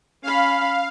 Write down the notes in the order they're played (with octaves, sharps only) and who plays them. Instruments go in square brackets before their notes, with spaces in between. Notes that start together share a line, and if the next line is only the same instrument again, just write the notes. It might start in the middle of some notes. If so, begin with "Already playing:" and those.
[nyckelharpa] C#4 B5 [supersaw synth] F5